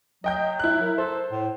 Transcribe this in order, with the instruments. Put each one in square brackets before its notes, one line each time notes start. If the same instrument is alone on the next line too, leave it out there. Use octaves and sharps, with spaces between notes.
[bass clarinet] F#3 [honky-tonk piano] D#5 G5 G6
[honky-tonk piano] E4 F#6
[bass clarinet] A#4
[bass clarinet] A4 [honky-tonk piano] C5
[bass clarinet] A2